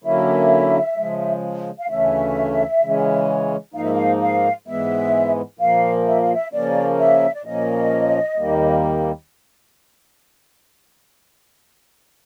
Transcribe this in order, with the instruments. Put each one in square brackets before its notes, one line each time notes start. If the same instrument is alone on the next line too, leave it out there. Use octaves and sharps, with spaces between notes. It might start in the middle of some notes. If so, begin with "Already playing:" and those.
[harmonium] D3 F#3 A#3 C#4 E4 [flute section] E5
[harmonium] C#3 F3 G#3
[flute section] F5
[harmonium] D2 C#3 E3 A3 C#4 [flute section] E5
[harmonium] C#3 E3 G#3 C#4
[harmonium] G#2 F3 A#3 D#4 [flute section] F5
[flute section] E5
F5
F5
[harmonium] G#2 E3 G#3 B3 [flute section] E5
[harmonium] A#2 F3 A#3 [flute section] F5
[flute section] E5
F5
E5
[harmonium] C#3 F3 A#3 C#4 [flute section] D5
[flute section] E5
D5
[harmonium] A#2 F3 A#3 C#4 [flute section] D#5
[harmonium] D#2 D#3 G3 A#3